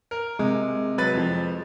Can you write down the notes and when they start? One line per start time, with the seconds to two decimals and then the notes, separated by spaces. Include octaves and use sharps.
0.11 A#4
0.39 C3 G#3
0.98 F#3 B4 A6
1.13 F2 F3